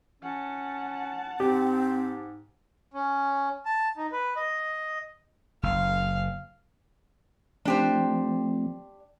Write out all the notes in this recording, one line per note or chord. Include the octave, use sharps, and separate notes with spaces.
C#4 F#5 A5
G#2 C4 G4
C#4
A5
D#4
B4
D#5
F#1 F5
F3 A3 C4 D4 G4 C5